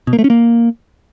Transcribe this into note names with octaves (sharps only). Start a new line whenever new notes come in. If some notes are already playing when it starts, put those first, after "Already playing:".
B2
A#3
A3
C#4
A#3